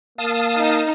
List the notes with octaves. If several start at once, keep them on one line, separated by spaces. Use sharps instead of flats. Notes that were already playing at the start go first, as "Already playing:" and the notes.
A#3 F5 A5 D#6
D#4